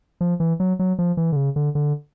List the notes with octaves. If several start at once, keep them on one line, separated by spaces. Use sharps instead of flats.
F3
E3
F#3
F#3
F3
E3
D3
C#3
D3
D3